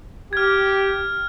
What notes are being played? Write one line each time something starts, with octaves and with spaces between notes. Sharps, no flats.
G4 F6 G#6